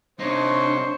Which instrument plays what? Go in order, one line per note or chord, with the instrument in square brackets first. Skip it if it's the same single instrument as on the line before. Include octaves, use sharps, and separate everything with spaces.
[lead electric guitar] C3 D#4 [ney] D4 [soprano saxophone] C5 [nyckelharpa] C#5